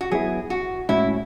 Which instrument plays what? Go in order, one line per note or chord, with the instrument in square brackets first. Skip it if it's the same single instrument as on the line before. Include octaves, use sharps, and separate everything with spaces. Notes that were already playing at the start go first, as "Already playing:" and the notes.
[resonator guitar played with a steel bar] F#4
[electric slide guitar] F#3 B3 E4 [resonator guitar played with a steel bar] G#4
[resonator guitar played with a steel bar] F#4
[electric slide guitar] A2 G#3 C#4 F#4 [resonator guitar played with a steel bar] E4